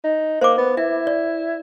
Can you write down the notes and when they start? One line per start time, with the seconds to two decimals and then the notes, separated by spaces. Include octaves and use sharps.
0.04 D#4
0.41 A#3 C5 D6
0.58 B3
0.77 E4 E5
1.07 D5